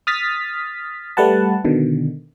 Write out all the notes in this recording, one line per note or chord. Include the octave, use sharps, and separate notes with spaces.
D#6 F6 A6 B6
G3 A3 B4 F#5 A5
B2 D3 D#3